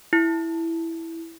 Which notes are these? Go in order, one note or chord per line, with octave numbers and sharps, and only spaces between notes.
E4